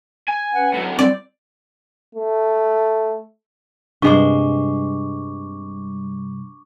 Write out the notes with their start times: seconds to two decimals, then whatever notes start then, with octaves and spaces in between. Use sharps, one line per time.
0.28 G#5
0.54 C#4 B4 F#5
0.73 A2 F#3
0.99 G3 C4 D5
2.15 A3
4.02 G2 C3 G3 G#3 C5 C#6 D6